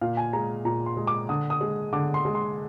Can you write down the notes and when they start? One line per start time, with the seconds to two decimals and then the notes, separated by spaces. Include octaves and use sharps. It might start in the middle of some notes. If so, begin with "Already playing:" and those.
0.01 A#2 F5
0.17 G#5
0.33 G#3 A#5
0.65 A#2 A#5
0.86 C6
0.97 G#3
1.07 D6
1.29 D3 D#6
1.50 D#6
1.61 G#3
1.93 D3 D6
2.14 C6
2.25 G#3
2.35 C6